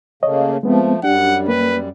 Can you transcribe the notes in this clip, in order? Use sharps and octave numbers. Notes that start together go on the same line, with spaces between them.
C#3 A3 A#3 C#5 D#5
F3 G#3 A3 B3 C4
F#2 G3 D4 G4 F#5
A#3 B4